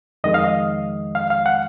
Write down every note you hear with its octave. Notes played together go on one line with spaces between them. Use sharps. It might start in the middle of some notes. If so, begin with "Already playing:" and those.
F2 D#3 G#3 D#5
F5
D#5
F5
F5
F#5